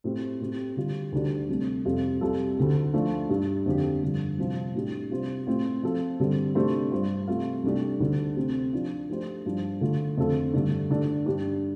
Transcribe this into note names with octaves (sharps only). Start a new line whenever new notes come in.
A2 A3 C4 G4
A2 A3 C4 G4
D3 G3 F4
D2 D3 G3 D4 G4
C2 C3 A3
F2 C3 G3 F4 A4
C2 C3 G3 F4 A4
D2 D3 A3
F3 A3 D4 F4
G2 G3 D4
F2 D3 F3 D4 G4
G2 D3 F3
C2 C3 F3 C4 F4
A2 G3 D4 G4
C3 G3 F4 C5
A2 A3 C4 F4 C5
F3 C4 A4 C5
G2 D3 G3 C4 A4
C3 A3 D4 G4 C5
G2 G3 F4 C5
C3 A3 F4
C2 C3 A3 D4 G4
D2 D3 G3 D4
C3 A3 C4
F3 D4 F4
F3 A3 D4 G4 C5
G2 F3 D4
D3 A3 F4
F2 D3 A3 F4 A4
G2 D3 A3 D4
D3 A3 D4 A4
G2 G3 D4 G4